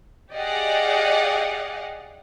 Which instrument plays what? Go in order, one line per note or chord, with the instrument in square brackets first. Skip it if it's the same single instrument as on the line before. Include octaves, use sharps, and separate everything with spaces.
[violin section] G4 G#4 D5 D#5 F5 F#5